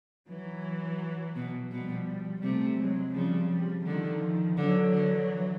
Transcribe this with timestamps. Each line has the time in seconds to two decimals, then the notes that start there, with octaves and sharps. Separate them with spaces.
0.29 E3 F#3
1.36 B2
1.71 B2 F3 G3
2.43 C3 G3 A3
2.78 F#3 G#3
3.14 C#3 F3 G3
3.50 F3 G3
3.86 D3 D#3 F3
4.57 D3 E3 F#3
4.92 D3